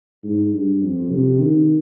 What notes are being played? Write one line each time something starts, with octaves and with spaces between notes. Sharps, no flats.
G#2
G2
F2
C3
D#3